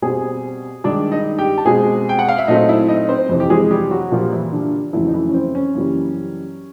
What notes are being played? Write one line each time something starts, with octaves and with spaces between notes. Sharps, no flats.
B2 G3 C4 G#4 G#5
G2 D#3 G#3 D4 D5
D#4 D#5
G4 G5
A5
B2 G#3 C4 G#4 G#5
G5
F#5
F5
E5
A#2 F#3 A3 C4 D#4 D#5
E4 E5
D#4 D#5
C4 C5
F2 C3 E3
G4
G#3 G#4
G3 G4
F#3 F#4
A#2 F3 G3 A#3 F4
E3 E4
D3 D4
F2 C#3 E3 F#3 A3 E4
D#4
E3 E4
C#4
C4
C#4
F#2 C#3 E3 G3 A#3